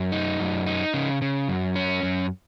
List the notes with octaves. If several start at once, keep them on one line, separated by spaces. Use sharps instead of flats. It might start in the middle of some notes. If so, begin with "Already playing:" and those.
Already playing: F#2
D#4
F#2
D#4
C#3
C#3
F#2
C#4
F#2